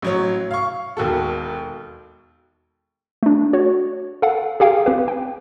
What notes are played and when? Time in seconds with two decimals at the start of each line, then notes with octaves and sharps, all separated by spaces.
0.02 A1 F#3 C#5
0.51 F5 C#6
0.97 E1 D#2 F#4 A4
3.23 A3 D4
3.53 F#4 C#5
4.22 A4 F5 F#5
4.60 G4 G#4 F5 G5
4.86 C4 G4 B4
5.08 G5